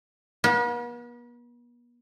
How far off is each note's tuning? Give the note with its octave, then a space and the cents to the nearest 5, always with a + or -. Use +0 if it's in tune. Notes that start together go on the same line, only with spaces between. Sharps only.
B3 -45